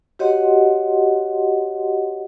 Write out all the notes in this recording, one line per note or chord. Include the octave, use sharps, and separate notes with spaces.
F#4 G4 C#5 D#5 F#5 C6